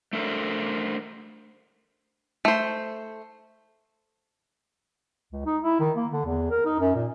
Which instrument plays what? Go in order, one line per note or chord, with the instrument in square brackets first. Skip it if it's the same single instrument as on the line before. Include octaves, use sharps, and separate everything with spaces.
[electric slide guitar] A3 D4 A4 A#4 C5
[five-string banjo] A3 C5
[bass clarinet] C#2
D#4
E4
D#3
A#3
D3
E2
A#4
D#4
F#2
A#2